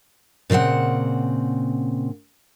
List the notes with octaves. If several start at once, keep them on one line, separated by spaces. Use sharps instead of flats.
A#2 C#3 F3 C4 F#5